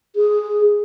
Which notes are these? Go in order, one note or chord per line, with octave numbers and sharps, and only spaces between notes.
G#4